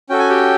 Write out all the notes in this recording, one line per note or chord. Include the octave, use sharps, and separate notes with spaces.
C#4 F#4 A4 G5
G#5
G4 G5